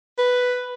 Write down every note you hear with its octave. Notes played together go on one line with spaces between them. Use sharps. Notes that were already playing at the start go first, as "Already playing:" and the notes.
B4